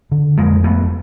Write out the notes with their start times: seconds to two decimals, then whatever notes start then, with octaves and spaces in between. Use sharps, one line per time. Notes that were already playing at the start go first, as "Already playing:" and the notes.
0.12 D3
0.38 F2 G#3 A#3
0.63 F2 A3 B3